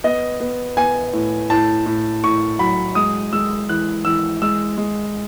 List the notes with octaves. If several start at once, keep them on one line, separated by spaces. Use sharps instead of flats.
B3 D#5
B3
B3 G#5
A2
A2 A5
A2
A2 C#6
F#3 B5
G#3 D#6
G#3 E6
E3 F#6
E3 E6
G#3 E6
G#3